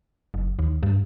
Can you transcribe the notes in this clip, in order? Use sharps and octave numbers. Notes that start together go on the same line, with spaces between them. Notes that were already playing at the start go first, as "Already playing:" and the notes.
F#1
D#2
G2